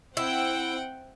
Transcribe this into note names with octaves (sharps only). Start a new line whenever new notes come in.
C4 E4 F#5 G5